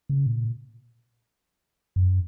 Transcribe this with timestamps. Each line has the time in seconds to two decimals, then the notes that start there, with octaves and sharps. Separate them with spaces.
0.09 C#3
0.26 A#2
1.96 F#2